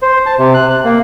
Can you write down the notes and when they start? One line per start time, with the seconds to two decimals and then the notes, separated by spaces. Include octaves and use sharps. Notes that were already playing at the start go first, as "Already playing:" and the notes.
0.02 C5
0.26 A5
0.38 C3
0.54 F#6
0.70 F#6
0.85 A#3